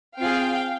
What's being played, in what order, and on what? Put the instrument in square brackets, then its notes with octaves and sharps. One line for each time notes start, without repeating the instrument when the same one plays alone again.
[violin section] C4 F4 G#4 F5 G5